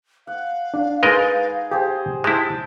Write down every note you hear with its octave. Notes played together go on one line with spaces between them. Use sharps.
F5 F#5
D4
G#3 D#4 G#4 A#4 B4 D#5 A6
G4 G#4 C5
G#3 E4 G5 A5